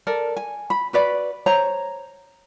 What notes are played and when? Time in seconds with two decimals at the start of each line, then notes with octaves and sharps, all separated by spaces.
0.07 A4 A#4 D5
0.37 G#5
0.70 B5
0.93 F#4 B4 D5 B5
1.46 C5 C#5 A#5